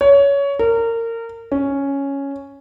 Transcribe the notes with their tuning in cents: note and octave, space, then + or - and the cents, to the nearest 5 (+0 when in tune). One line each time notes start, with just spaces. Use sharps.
C#5 +20
A#4 -25
C#4 +0